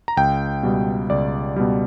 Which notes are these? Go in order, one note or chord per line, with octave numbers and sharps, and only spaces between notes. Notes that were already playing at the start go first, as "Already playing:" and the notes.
A#5
C#2 G5
B2 G3
C#2 D5
B2 G3